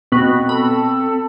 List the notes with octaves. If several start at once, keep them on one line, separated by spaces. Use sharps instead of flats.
B2 B3 C4 F#4
A4 B5